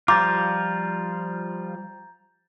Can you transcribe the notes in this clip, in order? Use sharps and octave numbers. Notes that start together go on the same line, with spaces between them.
F3 G3 F4 A#5 D6 G6 A6